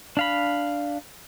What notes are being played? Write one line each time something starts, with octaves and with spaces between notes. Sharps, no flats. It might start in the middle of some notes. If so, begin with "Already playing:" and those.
D4 F5 B5